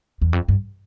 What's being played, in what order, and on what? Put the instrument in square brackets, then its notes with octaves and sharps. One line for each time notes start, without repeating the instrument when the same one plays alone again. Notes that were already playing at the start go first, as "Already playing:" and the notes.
[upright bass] E2
F2
G2